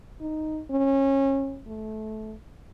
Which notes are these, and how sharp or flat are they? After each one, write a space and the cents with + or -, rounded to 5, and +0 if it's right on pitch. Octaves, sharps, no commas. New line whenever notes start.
D#4 -5
C#4 -25
A3 -20